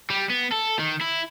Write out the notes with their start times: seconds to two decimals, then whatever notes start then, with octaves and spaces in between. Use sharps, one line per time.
0.10 G3
0.30 B3
0.52 A4
0.79 D#3
1.01 E4